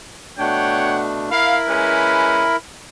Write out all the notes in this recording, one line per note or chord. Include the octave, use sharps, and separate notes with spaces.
B2 A3 D4 C#5 F#5 G5
E4 A#4 F5 B5
G#3 C#4 B4